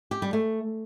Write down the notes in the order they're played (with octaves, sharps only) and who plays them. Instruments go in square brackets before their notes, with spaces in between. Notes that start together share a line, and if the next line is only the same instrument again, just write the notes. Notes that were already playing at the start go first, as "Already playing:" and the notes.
[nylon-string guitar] G4
G3
A3